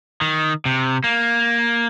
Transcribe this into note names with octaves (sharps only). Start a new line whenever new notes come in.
D#3
C3
A#3